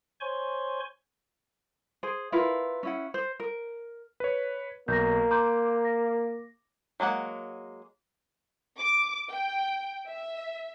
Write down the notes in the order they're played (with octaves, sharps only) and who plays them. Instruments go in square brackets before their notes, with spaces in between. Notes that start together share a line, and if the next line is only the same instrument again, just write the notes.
[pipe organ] C5 C#5 G#5 C6 C#6
[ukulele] G#4 C5
E4 F4 A#4 B4
C#4 E4 F#5
C5
A#4
[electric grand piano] B4 C#5
[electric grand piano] B1 [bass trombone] A#3 [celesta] G6 A#6
[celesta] A#5 C6 G6 [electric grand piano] D6
[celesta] A#6
[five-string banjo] F#3 G#3 A#3 F#5
[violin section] D6
G5
E5